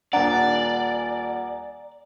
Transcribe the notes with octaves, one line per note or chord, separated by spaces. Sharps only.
D#1 D4 D5 F#5 G#5 A#5